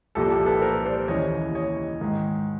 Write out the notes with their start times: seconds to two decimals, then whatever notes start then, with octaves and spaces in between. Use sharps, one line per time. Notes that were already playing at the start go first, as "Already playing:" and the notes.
0.15 C2 A#2 F3 G4 A4
0.31 G4 A4
0.46 A4 B4
0.62 A#4 C5
0.86 C5 D5
1.08 D#2 C#3 E3 C#5 D#5
1.55 C#5 D#5
2.01 G#2 D#3